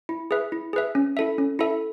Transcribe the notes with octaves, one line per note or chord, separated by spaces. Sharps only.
E4
G#4 B4 E5
E4
G#4 B4 E5
C#4
E4 A4 E5
C#4
E4 A4 E5